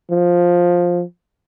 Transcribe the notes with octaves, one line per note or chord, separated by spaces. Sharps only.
F3